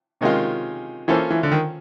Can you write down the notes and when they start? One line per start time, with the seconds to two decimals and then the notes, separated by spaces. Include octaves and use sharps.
0.21 C3 D#3 G#3 C#4 F4
1.08 E3 A#3 C#4 F4 A4 C5
1.30 E3
1.43 D3
1.52 D#3